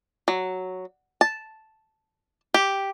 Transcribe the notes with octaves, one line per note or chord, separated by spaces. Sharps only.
F#3
A5
G4